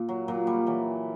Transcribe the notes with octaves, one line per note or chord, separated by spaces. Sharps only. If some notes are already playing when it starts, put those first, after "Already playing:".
Already playing: A#2
F#3
A#2 F#3
G3
E3 F#3